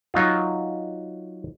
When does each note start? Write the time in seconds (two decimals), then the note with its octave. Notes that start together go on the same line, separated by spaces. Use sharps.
0.14 F#3 D#4 F4